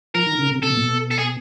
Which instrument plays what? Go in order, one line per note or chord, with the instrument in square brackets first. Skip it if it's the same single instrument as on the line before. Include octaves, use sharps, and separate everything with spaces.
[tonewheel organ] F3 [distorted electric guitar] A#4
[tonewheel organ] D#3
C#3
C3
[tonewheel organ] C3 [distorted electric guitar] A4
[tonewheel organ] B2
A#2
B2
[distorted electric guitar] A4
G#4